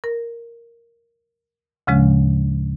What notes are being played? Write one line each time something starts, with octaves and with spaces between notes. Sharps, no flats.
A#4
D2 A2 C#3 F3 G#3 C#4